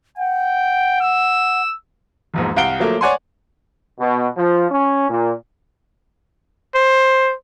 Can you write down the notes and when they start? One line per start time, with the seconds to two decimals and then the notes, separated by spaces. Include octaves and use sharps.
0.18 F#5 G5
1.01 E6
2.34 E1 A#1 G#2
2.56 C2 F5 F#5 D7 G7
2.80 F3 F#3 A3 A#3
3.01 C#5 D5 F#5 G#5 C6
3.99 B2
4.36 F3
4.71 C#4
5.10 A#2
6.75 C5